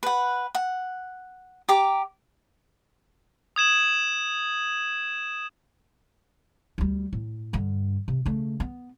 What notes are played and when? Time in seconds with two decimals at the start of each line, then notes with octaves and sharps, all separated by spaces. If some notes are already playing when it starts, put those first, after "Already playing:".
0.03 B4 F#5
0.55 F#5
1.69 G4 A#5 D6
3.56 D#6 G#6 E7 F#7
6.78 D2 G3
7.13 A2
7.53 G2 D3
8.08 C3
8.26 C#3 A3
8.60 B3